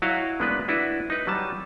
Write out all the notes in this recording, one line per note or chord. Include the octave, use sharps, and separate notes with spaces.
F#3 E4 F#4 C#5 D#5 F5
G#3 A#3 B3 D4 B4
D4 E4 F#4 B4
D#4 B4
F#3 G3 A5